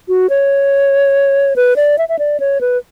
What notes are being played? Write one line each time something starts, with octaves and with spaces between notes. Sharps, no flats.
F#4
C#5
B4
D5
E5
E5
D5
C#5
B4